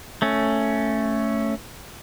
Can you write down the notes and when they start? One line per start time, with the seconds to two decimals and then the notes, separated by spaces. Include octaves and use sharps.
0.22 A3 C#4